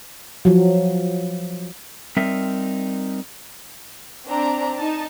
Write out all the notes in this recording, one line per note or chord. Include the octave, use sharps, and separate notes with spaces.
F3 F#3
G3 C4 D#4 A#4 E5
C4 D4 A#5
D#4 A5